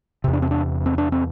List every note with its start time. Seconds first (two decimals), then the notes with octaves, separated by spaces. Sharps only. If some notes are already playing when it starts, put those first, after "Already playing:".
0.24 E2 C3
0.33 D4
0.42 C4
0.51 D4
0.86 C4
0.98 D4
1.12 C4